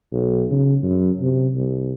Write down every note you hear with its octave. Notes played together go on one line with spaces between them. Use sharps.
B1
C#3
F#2
C3
C2